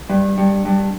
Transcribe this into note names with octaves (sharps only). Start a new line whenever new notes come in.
G2
G2
G2